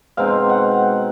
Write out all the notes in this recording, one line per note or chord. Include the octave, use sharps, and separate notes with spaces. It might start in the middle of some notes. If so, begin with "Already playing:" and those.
B2 G#3 C4 D#4 F5
F#5